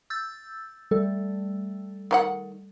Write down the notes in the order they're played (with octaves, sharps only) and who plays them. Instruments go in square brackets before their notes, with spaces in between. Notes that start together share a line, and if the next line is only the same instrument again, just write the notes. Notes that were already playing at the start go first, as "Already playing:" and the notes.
[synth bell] E6 G6 A6
G3 A3 A4
[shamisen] D#3 G4 F#5